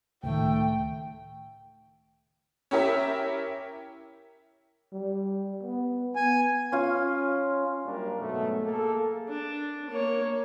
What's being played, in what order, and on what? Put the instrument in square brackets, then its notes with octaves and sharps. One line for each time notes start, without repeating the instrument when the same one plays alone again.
[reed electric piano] C#2 A2 D#3 [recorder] A3 [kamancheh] G5
[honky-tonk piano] C#4 E4 G4 A#4 E5
[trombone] G3
B3
[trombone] B3 [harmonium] G#5
[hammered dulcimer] C#4 F4
[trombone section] F#2 G3 A#3 D4 A#4
G#2 B2 F#3 A3
A#3 G#4 A4
[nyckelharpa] D4
A#3 C#5